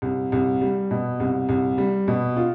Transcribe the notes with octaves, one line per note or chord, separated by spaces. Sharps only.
C2
C2
G3
B2
C2
C2
G3
B2
F4